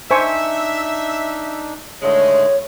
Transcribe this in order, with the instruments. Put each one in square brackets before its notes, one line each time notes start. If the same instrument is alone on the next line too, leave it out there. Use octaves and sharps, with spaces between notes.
[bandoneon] D4 D#4 [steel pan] C5 G#5 C#6 [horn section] E5
[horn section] A2 D#3 G#3 [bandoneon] D3 A3 [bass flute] C#5